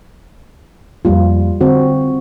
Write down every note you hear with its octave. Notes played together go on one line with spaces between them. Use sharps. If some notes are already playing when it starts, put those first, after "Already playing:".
F2 G3 A#3 F4
D3 C4 F#4